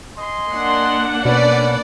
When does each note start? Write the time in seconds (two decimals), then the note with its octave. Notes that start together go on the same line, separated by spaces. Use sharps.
0.18 D#5 G#5 C6
0.52 A#3 D4 F#5
1.25 B2 C#4 B4 D5